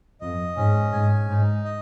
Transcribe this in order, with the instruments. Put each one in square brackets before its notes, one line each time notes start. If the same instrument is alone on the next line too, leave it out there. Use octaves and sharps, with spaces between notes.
[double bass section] F2 [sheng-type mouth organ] D#5
[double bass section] G#2 [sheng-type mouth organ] C#4
[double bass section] G#2 [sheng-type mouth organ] G#5
[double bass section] G#2 [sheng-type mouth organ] D#4
[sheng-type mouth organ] D#5